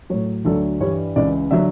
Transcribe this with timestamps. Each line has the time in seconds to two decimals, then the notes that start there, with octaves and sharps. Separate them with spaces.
0.10 A2 F#3 C#5
0.45 D2 D3 F#3 A4
0.80 G2 E3 G3 C#5
1.16 C#2 C#3 E3 D5
1.51 D3 F#3 E5